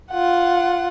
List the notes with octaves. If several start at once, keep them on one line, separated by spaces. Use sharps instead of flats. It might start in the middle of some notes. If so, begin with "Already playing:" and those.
F4 F#5